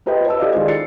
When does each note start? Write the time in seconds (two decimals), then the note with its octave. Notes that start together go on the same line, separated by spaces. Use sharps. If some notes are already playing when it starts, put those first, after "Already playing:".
0.06 F4 G4 B4 C5 D#5 G5
0.26 B4 A5 E6
0.39 G4 A4 D5 D#5 F5
0.52 D#3 G#3 F4 C5 D5
0.68 A6 C7 C#7